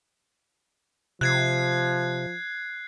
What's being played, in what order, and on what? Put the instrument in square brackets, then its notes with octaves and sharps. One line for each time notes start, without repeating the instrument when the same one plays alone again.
[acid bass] C3 [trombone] F3 [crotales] F#6 G#6 C7